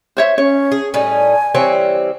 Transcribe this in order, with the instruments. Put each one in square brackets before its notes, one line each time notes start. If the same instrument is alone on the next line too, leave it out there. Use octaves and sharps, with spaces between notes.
[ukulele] C5 C#5 E5
[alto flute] C#4 [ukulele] C#5
[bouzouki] G#4
[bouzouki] A2 G3 D#4 [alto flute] G#5
[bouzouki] E3 G3 C4 [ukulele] C#5